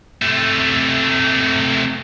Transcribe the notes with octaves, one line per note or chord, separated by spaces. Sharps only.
C3 A3